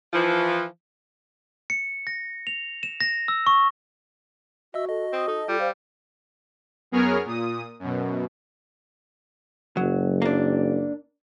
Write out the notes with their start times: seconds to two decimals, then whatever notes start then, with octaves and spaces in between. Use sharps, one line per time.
0.13 E3 F3
1.70 C#7
2.07 A#6
2.47 F7
2.83 E7
3.01 A#6
3.28 E6
3.47 C#6
4.74 F#4 D#5 E5 E6
4.88 A4 D#5
5.13 C4 D#6
5.28 D#4 A4
5.48 G3 F4
5.60 C5 F5
6.91 F#2 B3 G#4 A#4 C#5 F6
7.25 A#2 D#6
7.79 F#2 B2
9.77 F#1 F#3
10.22 A#3 D4